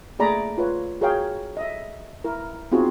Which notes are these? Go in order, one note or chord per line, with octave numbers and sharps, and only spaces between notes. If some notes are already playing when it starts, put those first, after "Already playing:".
A3 A#3 G#4 D5 A#5 B5
F4 B4 C#5
F#4 G#4 A#4 C#5 F5 G5
D#5 E5
E4 A#4
B3 C4 D#4 F4 F#4 G#4